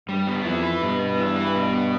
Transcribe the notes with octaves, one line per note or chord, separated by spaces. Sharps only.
G2 G3
B3
F2 E4
B4
G2 B2
B3
E4
B4
B2
B3